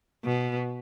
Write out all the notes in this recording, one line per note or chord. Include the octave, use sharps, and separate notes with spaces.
B2